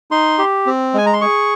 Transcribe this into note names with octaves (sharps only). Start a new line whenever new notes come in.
D#4 C6
G4
C4
G#3 G#5
A#5
C6
G#4 C#6